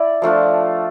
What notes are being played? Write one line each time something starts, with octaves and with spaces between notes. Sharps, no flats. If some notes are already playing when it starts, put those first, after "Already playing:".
Already playing: E4 D5
F3 A3 D4 F4